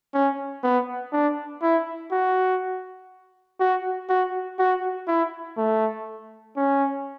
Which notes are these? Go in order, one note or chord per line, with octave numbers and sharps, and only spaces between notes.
C#4
B3
D4
E4
F#4
F#4
F#4
F#4
E4
A3
C#4